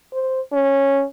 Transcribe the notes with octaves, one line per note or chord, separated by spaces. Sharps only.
C5
C#4